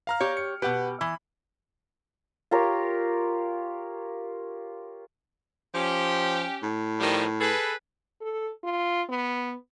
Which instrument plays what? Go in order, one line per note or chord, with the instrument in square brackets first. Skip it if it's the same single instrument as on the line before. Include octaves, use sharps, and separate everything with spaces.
[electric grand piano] F5 A#5 F6
[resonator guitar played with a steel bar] G4 C#5
[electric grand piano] C#7
[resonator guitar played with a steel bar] B2 G4 [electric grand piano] B4 F#5
[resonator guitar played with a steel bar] E3 [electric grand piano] B5
[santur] F4 G4 A#4 C#5
[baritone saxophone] F3 [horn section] C#4 G4
[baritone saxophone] A2
[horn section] D#3 F3 G3
G#4 A4 B4
[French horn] A4
F4
B3